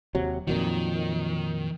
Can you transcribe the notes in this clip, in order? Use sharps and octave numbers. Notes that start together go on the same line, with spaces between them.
D#2 C3 F#3
F2 A#2 D#3 F#3